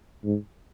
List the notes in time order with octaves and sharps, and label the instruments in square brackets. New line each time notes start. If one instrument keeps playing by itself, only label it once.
[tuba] G#2